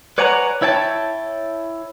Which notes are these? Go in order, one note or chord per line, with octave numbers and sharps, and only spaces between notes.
B4 C#5 D5 F#5 G#5 A#5
E4 C#5 G5 A5